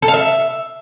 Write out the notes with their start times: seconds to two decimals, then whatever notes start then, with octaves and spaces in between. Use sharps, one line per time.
0.02 A4
0.08 F5
0.14 E5